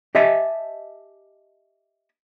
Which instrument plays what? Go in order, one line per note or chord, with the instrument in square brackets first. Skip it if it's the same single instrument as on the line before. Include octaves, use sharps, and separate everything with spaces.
[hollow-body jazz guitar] G4 D#5 E5 G#5 A5